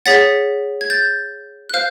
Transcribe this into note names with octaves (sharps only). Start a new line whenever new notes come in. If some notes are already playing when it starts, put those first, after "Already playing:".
G#4 C#5 F#5 A6 B6
G#6
G6 A6
F#6
C5 F5 F6 G6